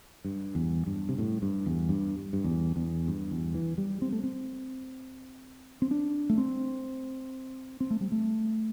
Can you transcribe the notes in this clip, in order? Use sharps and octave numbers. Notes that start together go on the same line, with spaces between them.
G2
E2
G2
C3
A2
G2
E2
G2
G2
E2
E2
G2
E2
E3
G3
C4
A3
C4
C4
D4
A3
C4
C4
A3
G3
A3